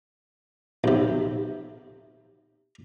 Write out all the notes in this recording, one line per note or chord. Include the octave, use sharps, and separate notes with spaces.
B1 C3